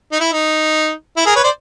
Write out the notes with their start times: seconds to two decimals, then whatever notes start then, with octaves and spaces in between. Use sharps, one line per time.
0.12 D#4
0.20 E4
0.32 D#4
1.17 E4
1.26 G#4 A#4
1.36 B4 C#5
1.43 C5 D5